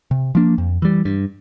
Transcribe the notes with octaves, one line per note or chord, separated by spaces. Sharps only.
C3
F3 A#3 D4
F2
E3 G3
G2